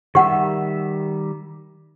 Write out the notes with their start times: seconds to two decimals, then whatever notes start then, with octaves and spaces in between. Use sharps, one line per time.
0.15 D#3 G3 G4 E5 F#5